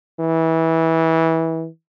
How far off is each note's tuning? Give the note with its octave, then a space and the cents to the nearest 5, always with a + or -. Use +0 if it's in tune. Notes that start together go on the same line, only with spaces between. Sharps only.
E3 -20